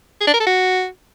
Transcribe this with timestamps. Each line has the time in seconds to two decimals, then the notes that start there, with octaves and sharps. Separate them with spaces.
0.21 G#4
0.27 D4
0.33 A#4
0.40 A4
0.46 F#4